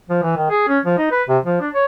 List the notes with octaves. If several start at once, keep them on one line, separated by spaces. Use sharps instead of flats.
F3
E3
D#3
G#4
C#4
F3
D#4
B4
C3
F3
D4
C#5